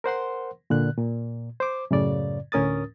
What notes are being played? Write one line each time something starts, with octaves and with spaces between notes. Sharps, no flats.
A#4 C5 F#5 C6
A#2 D3 F#6
A#2
C5 D6
F#2 A2 C#3 D5
D2 A2 C#4 A#4 D#6 A6